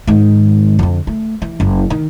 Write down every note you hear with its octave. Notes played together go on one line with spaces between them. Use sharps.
G#2 D#3
F2 D3
A3
E3
F#1
D#3